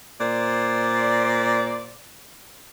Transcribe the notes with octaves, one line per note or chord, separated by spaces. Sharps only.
A#2 C5 D5